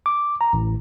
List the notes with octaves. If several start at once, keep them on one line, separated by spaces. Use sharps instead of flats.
D6
A#5
A1